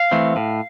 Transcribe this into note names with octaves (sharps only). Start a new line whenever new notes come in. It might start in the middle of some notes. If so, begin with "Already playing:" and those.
Already playing: F5
E3 A3 C4
A2